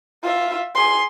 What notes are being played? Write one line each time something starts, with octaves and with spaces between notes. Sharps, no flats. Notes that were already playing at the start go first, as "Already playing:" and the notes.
F4 E5
G#4 C6